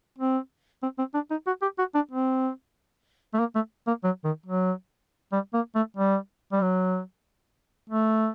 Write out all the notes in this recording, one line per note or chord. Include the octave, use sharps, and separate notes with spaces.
C4
C4
C4
D4
D#4
F#4
G4
F#4
D4
C4
A3
A#3
A3
A#3
F#3
D#3
F#3
G3
A#3
A3
G3
G3
F#3
A3